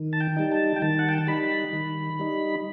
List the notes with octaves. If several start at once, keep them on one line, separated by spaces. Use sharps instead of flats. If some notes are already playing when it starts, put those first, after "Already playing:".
Already playing: D#3
A5
G5
G3 D#4
A5
G5
D#3 A5
F#5
G5
A5
G3 D#4 B5
D#3
G3 D#4